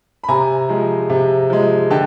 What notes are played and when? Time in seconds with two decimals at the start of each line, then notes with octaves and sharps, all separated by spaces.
0.24 B5
0.28 C3 G#5 A#5
0.69 F3 G#3
1.10 C3
1.50 F3 G#3
1.90 D3 G5 A5